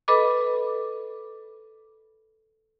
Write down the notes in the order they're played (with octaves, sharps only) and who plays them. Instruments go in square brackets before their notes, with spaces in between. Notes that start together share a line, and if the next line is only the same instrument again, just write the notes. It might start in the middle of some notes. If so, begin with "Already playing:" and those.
[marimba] A4 B4 D#5 B5 D6